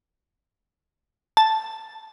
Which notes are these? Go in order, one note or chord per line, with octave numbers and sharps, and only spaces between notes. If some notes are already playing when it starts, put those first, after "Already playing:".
A5